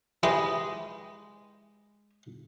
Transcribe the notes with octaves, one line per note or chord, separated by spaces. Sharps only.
G#3 E4 G4 B4